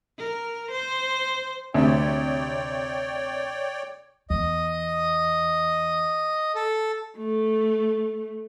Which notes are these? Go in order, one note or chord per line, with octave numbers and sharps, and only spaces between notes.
A#4
C5
D2 C3 C#5 D5 G5
E2 D#5
A4
A3